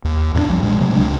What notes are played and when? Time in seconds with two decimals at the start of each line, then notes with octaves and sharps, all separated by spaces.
0.04 D#2
0.34 E2 A#2 B3 D4
0.48 A#1 E2 F3 G3
0.63 A#2 G#3
0.80 C3 F#3 G#3 A3
0.95 C#2 C3 D4